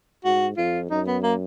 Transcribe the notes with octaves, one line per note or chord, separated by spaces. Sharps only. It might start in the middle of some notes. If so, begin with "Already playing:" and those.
G#2 F#4
F2 F4
F#2 D#4
B3
A#3